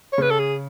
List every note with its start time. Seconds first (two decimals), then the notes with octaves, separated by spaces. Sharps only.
0.13 C#5
0.18 C#3 B4
0.31 A4
0.39 G#4